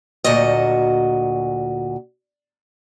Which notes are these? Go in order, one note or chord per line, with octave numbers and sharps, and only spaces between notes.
D2 A#2 F#3 F#4 D#5